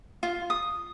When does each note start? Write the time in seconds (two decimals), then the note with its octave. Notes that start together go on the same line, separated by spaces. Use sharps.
0.23 F4
0.50 D#6